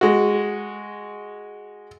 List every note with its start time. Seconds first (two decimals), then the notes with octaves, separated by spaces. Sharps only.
0.01 G#3 F#4